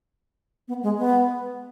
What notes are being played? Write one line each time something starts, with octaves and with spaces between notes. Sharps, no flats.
B3
G#3
B3